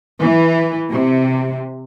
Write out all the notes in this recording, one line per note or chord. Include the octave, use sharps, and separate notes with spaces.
E3
C3